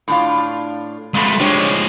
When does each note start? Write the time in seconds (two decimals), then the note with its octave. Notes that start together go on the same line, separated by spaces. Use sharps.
0.08 A2 D4 F4
1.14 F2 B2 G#3 A3
1.40 F3 G#3 D4 G4 C#5